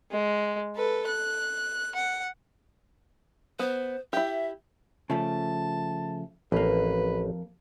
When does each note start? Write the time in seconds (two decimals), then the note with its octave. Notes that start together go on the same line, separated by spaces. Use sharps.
0.11 G#3
0.76 A4 B4
1.07 F#6
1.95 F#5
3.59 B3 C5
4.13 E4 G4 E5
5.10 C#3 F3 A3 A5
6.52 A1 F2 A#3 B4